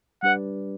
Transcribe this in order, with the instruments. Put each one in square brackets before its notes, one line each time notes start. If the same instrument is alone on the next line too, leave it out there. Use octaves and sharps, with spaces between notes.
[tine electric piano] G3 D4 G4 B4 D5 [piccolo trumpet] F#5